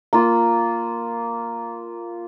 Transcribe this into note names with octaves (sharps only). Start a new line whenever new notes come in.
A#3 F4